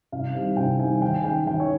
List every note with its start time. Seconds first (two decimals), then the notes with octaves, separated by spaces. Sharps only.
0.12 C2 F5
0.35 C3 D#3 G3
0.57 C2 G5
0.79 C3 D#3 G3 G#5
1.01 D#2 G5
1.14 G#5
1.24 D#3 G#3 G5
1.47 D#2 G5
1.60 C#5